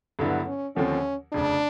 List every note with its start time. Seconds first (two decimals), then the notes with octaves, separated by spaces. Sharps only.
0.19 G2 D3 F#3 B3 D4 E4
0.47 C#4
0.76 D#2 D3 F3 A3 C4 C#4
1.33 F1 F2 C#3 D4